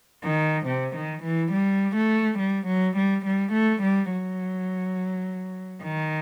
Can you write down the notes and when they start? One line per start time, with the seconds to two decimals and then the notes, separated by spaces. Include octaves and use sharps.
0.23 D#3
0.65 C3
0.94 D#3
1.23 E3
1.51 G3
1.95 A3
2.38 G3
2.67 F#3
2.95 G3
3.25 G3
3.53 A3
3.82 G3
4.11 F#3
5.83 D#3